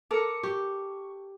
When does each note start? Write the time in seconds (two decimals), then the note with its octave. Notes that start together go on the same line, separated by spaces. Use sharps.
0.11 A4 A#4 D6 C#7
0.43 G4 C#6